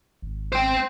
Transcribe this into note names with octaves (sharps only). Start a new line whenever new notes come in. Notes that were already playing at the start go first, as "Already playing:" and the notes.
G#1
C5 G5